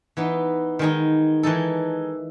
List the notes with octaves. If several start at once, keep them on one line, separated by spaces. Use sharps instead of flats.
E3 B3 D#4
D#3 G#3 D#4
E3 G#3 D#4 A4